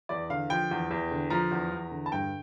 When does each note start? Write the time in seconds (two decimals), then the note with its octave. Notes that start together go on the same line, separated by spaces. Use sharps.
0.09 E2 D5
0.30 D3 F5
0.50 F3 G5
0.71 E2
0.91 E2
1.11 D3
1.30 F3 A#5
1.51 E2
1.72 E2
1.91 D3
2.06 A5
2.12 G2 G5